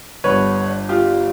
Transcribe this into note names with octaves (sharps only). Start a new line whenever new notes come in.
G1 G2 D3 B4 C#5
F4 G4